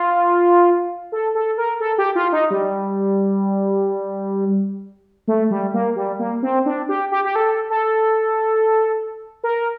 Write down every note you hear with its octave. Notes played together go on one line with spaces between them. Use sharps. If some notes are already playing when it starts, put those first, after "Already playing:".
Already playing: F4
A4
A4
A#4
A4
G4
F4
D#4
G3
A3
G3
A#3
G3
A#3
C4
D4
G4
G4
G4
A4
A4
A#4